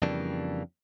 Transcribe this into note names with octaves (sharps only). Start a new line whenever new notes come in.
F2 C#3 E3 G3 A#3 D4